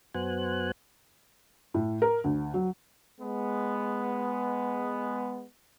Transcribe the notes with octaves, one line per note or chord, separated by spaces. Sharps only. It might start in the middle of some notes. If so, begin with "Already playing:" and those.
F#2 B3 F#4 C5 G#5 F#6
A2
A#4
D2
F#3
G#3 B3